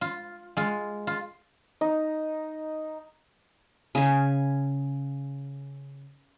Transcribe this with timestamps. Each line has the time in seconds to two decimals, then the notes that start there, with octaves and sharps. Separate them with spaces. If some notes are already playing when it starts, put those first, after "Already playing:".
0.01 F4
0.57 G#3 F4
1.07 F4
1.81 D#4
3.95 C#3 G#5